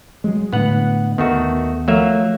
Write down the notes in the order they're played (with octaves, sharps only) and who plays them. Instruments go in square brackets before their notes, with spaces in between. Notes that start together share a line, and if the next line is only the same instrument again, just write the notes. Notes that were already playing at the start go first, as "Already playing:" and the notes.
[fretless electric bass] F#3 G#3
[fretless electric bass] A2 D3 [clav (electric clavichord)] B3 F#5
[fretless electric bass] D#2 B3 [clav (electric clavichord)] D#3 A3 F#4
[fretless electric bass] F3 A3 [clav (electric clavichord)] F#3 A#3 E5